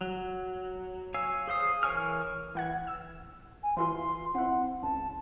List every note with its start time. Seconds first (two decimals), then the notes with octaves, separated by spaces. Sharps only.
0.01 F#3
1.14 C#5 F5 G#5 E6
1.47 G#4 C5 F5 D#6
1.83 E3 A#4 C#5 G#5 F6
2.55 E3 F#5 G#6
2.87 E6
3.63 G#5
3.77 E3 E4 F4 C6
4.35 C4 E4 F#5
4.83 C#2 A5